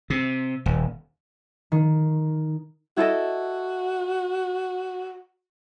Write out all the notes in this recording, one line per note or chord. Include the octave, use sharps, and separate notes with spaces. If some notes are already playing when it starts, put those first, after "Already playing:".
C3
D#1
D#3
E4 F#4 A4 D#5